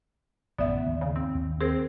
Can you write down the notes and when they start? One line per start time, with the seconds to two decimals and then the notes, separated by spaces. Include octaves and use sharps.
0.58 A1 F#2 C#3 B3 D5 E5
0.86 D#2 G#2
1.01 C#3
1.16 C4
1.35 D#2
1.61 C4 G#4 A#4 C5